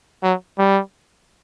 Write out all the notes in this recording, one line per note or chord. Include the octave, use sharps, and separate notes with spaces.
F#3
G3